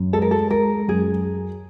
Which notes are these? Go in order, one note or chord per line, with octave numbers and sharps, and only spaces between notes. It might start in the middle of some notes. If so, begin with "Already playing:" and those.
Already playing: F#2
G#3 A4
A#4
A4
G#3 A#4
F#2 G#4